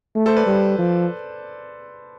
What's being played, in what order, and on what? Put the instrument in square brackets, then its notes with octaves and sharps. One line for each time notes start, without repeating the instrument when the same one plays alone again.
[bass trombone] A3
[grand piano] A4 C5
B4 D5
[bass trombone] G3
F3